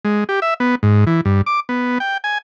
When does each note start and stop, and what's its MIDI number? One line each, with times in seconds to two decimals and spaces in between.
0.05 0.24 56
0.29 0.40 67
0.42 0.54 76
0.60 0.75 59
0.83 1.05 44
1.07 1.21 52
1.25 1.42 43
1.46 1.60 86
1.69 1.98 59
2.00 2.18 79
2.24 2.38 80